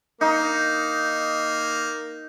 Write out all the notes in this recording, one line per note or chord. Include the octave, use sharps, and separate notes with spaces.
A#3 D#4